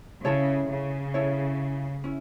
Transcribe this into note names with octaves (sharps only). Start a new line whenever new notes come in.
C#3 C#4 E4 A4 C#5
C#3
C#4 E4 A4 C#5
C#4 E4